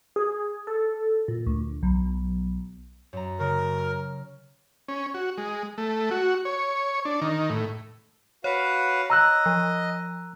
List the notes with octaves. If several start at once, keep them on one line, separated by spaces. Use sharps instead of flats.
G#4
A4
A#2
D2
B1
F#2 A#5
C#3 A#4
F6
C#4
F#4
G#3
A3
F#4
C#5
D4
D#3
A2
F#4 B4 C#5 F5
D#5 A#5 E6 F#6
F3